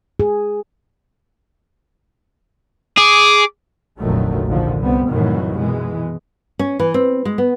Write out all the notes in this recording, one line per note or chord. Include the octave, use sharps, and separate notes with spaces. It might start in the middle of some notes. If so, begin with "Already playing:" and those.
G#4
G#4 D6
F1 A#1 D3 D#3 F#3 A3
A#1 G#2 D3 D#3 F3
C2 G2 G3 B3 C4
C2 F#2 A2 D#3 E3 F#3
B2 E3 G#3
C#4
E3
C4
G#3
B3